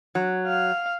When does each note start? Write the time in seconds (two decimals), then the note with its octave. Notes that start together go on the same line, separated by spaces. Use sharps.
0.15 F#3
0.47 F5